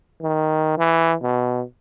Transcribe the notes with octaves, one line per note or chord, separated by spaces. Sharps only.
D#3
E3
B2